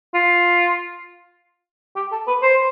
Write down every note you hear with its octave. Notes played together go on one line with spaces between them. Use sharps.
F4
G4
A4
B4
C5